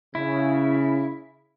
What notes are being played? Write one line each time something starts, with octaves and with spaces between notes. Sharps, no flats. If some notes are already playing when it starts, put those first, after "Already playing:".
C#3 E4